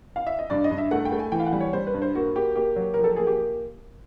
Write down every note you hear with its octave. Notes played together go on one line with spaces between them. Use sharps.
F5
E5
D#5
G2 D5
D#5
G2
E5
A3 F#5
G5
A3
G#5
E3 G5
F5
F#5
G3
C#5
G3 C5
B4
G2
C5
A#3 F#4
A#3 G4
A#3 G4
F#3
F3 A#4
A4
A#3 G#4
G4